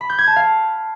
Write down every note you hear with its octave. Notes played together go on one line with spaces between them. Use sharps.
B5
G6
G#6
A5
F5